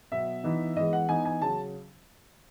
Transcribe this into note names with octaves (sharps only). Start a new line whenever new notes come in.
B2 F#3 B3 E5
E3 B3 D#4
E3 G#3 B3 D#5
F#5
E3 B3 D#4 G#5
G#5
C#3 F#3 C#4 A5